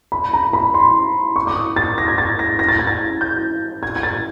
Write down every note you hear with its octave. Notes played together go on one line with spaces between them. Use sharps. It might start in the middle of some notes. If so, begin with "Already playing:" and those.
B5
A#5
B5
C6
C#6
D6
D#6
A6
A#6
G#6
A6
A#6
A#6
A6
G#6
A6
G6
G#6
G#6
A6